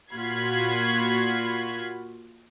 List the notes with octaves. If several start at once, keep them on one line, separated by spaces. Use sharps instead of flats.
A#2 F4 F#4 B5 G#6 C7